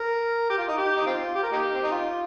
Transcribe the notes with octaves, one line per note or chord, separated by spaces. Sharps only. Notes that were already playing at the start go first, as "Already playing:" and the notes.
Already playing: A#4
G4
F4
D#4
G4
D#4
C4 F4
G4
A#4
A#3 D#4 G4
C4
D#4
F4